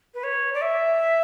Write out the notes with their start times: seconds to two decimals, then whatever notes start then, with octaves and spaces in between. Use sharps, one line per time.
0.14 B4
0.23 C#5
0.53 D5
0.61 E5